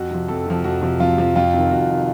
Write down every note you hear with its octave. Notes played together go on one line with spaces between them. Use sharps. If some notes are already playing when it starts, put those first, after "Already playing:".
Already playing: F2 F#4
C3 F3
F2 A4
C3 F3
F2 F#4
C3 F3
F2 F4
C3 F3
F2 F4
C3 D#3
F2 F#4
C3 D#3